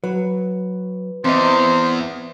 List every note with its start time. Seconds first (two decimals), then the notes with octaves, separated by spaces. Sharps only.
0.04 F#3 B4
1.24 E2 C4 C5 D#5